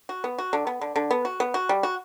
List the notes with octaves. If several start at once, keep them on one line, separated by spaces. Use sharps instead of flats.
F#4
B3
F#4
D3
B3
D3
D3
B3
F#4
B3
F#4
G3
F#4